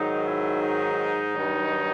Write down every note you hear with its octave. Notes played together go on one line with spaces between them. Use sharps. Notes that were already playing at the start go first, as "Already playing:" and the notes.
Already playing: G#2 D#3 F#3 D#4
E4
D#4
G2 D#3 F#3